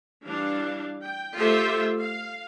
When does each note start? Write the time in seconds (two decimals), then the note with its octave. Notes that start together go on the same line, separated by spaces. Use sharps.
0.24 E3 G3 D4 F5
1.02 G5
1.36 A3 F4 G4 A4 C5 E5
1.99 F5